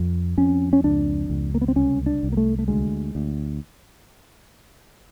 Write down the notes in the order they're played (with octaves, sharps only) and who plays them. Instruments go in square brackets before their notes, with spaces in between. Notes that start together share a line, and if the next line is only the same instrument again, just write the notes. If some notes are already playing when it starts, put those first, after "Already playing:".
Already playing: [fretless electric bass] F2
F2 C#4
C#4
C#2 D4
C#2
A#3
B3
C4
C2 C#4
D4
C2
A#3
A3
A3
D2 G#3
D2